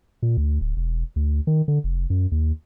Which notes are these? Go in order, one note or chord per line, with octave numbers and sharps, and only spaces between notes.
A#2
D2
D1
E1
D2
D#3
D3
F1
F#2
D#2